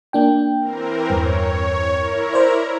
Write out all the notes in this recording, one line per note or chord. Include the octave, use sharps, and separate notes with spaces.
A#3 D4 G5
E3 C4 A#4
E2 G2 C#5
E4 A#4
C5 D5